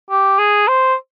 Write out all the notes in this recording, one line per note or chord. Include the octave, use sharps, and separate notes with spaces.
G4
G#4
C5